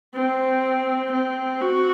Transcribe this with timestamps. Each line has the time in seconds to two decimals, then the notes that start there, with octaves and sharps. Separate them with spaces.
0.15 C4
1.13 C4
1.61 F#4